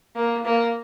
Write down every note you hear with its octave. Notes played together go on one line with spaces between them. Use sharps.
A#3
A#3